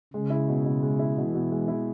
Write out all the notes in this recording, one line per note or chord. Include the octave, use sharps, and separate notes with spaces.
C#3 G#3
E4
B2
B2
G#3
E4
B2 E3
B2
G#3
E4